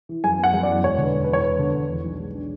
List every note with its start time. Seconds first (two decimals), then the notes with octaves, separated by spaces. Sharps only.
0.09 E3
0.24 F#2 G#5
0.39 B3 F#5
0.54 F#2
0.63 D5
0.68 E3
0.83 E1 C#5
0.98 D3
1.04 B4
1.14 E1
1.24 E2 B4
1.33 C#5
1.43 E1 B4
1.59 D3
1.74 E1
1.89 E2
2.04 B1
2.19 G#3
2.34 D4